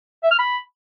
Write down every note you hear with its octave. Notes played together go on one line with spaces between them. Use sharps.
E5
F6
B5